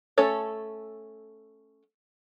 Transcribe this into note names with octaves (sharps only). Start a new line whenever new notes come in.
A3 C#4 A4 C#5